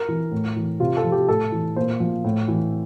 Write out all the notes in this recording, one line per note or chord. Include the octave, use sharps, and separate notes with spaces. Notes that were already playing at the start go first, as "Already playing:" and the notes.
Already playing: A#4
E3
A2
E3
C3 F4
A4
F3
G4
A2 A4
E3
A#2 C5
F3
A2
E3